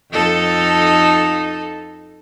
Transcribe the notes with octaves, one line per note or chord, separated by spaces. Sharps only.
F2 D#4 A4